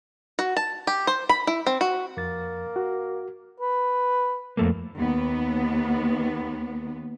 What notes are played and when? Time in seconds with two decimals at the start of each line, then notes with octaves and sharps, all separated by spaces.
0.39 F#4
0.57 A5
0.87 G4
1.07 C5
1.29 B5
1.47 E4
1.66 C4
1.81 F#4
2.17 F2 A#3 A6
2.76 F#4
3.60 B4
4.57 F2 A3 A#3
4.97 D#2 B3